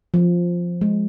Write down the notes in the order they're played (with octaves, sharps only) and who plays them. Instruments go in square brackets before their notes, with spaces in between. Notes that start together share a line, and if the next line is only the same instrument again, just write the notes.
[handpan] F3
G#3